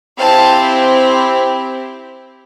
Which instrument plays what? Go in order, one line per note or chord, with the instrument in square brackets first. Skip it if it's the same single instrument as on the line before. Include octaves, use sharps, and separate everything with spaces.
[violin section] C4 E4 G4 F5 A5